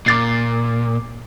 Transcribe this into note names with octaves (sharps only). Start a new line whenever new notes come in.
A#2 D6 A6 C7